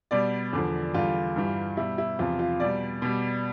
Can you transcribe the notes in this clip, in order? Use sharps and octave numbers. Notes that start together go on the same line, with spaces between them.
B2 G3 D5
E2 D3 F3
E2 D3 G3 F4
G2 E3 G3
B2 G3 E4
E4
E2 C3 F3 F4
F4
B2 G3 D5
B2 G3